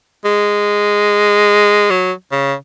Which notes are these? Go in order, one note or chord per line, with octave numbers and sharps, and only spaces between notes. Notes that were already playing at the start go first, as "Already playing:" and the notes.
G#3
F#3
C#3